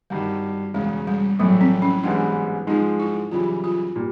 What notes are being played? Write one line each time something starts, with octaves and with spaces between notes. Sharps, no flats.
G#1 G2 D#3 G3
E1 E2 C#3 G#3
G3
A#1 A2 E3 F#3 A3
C4
C#4
A1 G#2 E3 G#3 B3 D4
G#2 F3 G#3 D#4
E4
F#2 C#3 E3 G3 F4
F4
A#2 G3